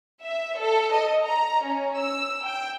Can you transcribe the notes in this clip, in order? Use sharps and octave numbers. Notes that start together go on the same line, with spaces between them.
E5
A4
D#5
A#5
C#4
E6
G5